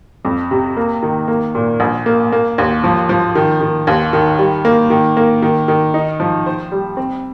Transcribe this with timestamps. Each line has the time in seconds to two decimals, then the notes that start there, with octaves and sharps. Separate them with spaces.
0.25 F2
0.51 C3
0.77 A#3
1.03 D#3
1.28 A#3
1.55 A#2
1.80 A#1
2.06 A#3
2.32 A#3
2.58 D#2
2.84 F3
3.09 F3
3.35 D#3
3.61 D#3
3.87 D#2
4.13 D#3
4.39 G3
4.65 A#3
4.90 D#3
5.17 A#3
5.42 D#3
5.68 D#3
5.94 D#4
6.20 F3
6.46 C5
6.72 G3
6.97 C4